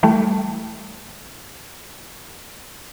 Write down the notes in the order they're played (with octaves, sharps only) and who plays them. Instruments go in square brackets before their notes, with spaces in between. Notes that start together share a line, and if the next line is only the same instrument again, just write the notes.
[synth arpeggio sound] E3 G3 A3